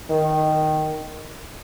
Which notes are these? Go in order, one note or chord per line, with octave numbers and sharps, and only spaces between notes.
D#3